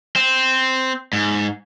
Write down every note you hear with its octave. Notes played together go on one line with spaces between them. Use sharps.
C4
G#2